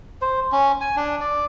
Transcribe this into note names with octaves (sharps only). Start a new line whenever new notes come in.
C5
C#4
G#5
D4
D5